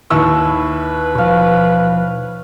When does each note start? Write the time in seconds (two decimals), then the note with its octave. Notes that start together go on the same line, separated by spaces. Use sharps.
0.10 D#2 E4 B4 C#6 E6
1.15 B2 F3 C#5 F5